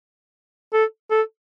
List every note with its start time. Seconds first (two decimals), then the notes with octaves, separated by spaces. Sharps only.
0.73 A4
1.10 A4